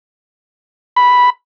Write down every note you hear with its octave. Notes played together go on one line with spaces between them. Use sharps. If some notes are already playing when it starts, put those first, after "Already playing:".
B5